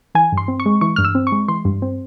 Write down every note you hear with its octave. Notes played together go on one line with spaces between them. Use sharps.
E3 G#5
G2
C6
C4
C#6
G#3
E3 C#6
G2 F6
E6
C4
C#6
G#3
E3 C6
G2
C4